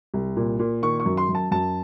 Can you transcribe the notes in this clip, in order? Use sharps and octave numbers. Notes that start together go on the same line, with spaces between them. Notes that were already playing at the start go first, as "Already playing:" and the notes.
C2
A#2
A#2
D#3 C#6
C#6
F#2
C6
F#2
A5
F#2 A5